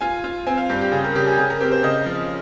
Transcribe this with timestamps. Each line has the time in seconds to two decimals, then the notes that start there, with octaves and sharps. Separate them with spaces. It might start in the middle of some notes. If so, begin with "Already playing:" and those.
0.01 F4 G#5
0.24 F4
0.47 C4 G#5
0.58 F5
0.69 G2 G4
0.81 G4
0.92 C#3 G#4
1.04 A#4
1.15 C#3 G4
1.27 G#4
1.38 C#3 G#4
1.50 A#4
1.61 C4 G4
1.72 C5
1.83 C#3 D#5
2.06 F3